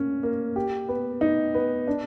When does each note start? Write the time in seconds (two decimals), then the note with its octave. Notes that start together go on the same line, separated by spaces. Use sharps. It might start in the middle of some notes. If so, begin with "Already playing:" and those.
Already playing: A#3 C#4
0.23 A#3
0.56 G4
0.88 B3
1.21 D#4
1.54 B3
1.87 D4